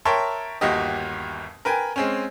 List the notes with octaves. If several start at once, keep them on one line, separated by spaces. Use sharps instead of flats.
A#4 C#5 E5 G5 A5 C6
G1 D#2 F#4 G4 D#5
A#4 B4 G5 G#5
G#3 C4 C#4